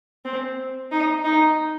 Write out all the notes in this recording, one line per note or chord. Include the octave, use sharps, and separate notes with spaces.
C4
D#4
D#4